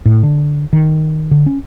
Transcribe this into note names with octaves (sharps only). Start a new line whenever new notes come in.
A2
D3
D#3
D3
C#4